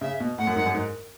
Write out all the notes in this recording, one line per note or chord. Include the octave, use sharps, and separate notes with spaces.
C#3 E5
B2
A2 F#5
F#2
G#2
F#2
G#2